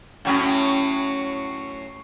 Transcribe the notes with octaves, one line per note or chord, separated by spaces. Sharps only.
A2 F#3 C#4